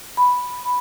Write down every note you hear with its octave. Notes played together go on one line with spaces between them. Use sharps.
B5